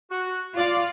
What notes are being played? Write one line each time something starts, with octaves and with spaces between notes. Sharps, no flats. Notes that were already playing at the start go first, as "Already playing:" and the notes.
F#4
F4 D5 F5